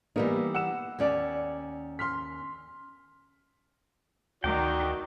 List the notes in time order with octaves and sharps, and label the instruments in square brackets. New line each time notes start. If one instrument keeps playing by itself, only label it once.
[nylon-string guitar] E3 G3 D#4 [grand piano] A#3 B3
[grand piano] F#5 E6 E7
[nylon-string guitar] D#2 C#4 D5
[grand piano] C6 F6 B6
[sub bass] D2 [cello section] D#3 [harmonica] F#4 D5 [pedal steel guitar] G5 D6